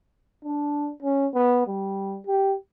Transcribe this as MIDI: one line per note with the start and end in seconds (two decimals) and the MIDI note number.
0.45 0.91 62
1.03 1.27 61
1.34 1.63 59
1.67 2.18 55
2.27 2.56 67